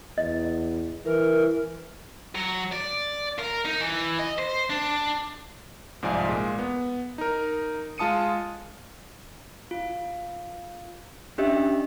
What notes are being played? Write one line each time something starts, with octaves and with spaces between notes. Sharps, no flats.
E2 D#5
E3 A#4
F#3
D5
A#4
D#4
E3
D#5
C5
D4
C2 G#2 F3 D5 G#5
A#2 G#3
B3
D#4 A#4
G#3 F4 A5 D#6 C#7 D#7
F4
C#4 D4 G4 D#5 E5